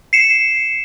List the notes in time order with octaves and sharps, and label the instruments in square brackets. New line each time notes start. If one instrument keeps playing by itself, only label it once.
[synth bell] C7 C#7 E7